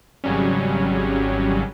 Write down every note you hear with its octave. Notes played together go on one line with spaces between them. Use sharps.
G#1 C#3 F#3 G3 C#4